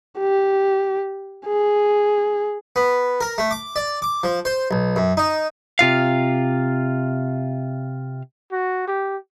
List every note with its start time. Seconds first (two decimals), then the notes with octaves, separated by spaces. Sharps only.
0.19 G4
1.46 G#4
2.76 B3
3.21 A#4
3.38 A3
3.51 D6
3.76 D5
4.02 D6
4.23 F3
4.45 C5
4.71 B1
4.96 F#2
5.17 D#4
5.79 C3 F4 F5
8.52 F#4
8.87 G4